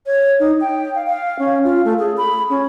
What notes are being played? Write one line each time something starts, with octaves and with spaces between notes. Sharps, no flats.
C#5
D#4
G5
F5
F5
C#4
F4
A3
G#4
B5
C#4